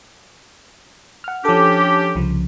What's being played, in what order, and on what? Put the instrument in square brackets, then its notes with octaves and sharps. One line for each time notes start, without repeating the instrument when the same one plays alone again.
[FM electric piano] F#5 F6
[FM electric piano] F3 A4 [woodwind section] C#4 D4 G4
[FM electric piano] C2 C#3 F3